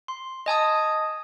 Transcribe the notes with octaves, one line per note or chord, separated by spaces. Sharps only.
C6
D#5 G#5 A5 D#6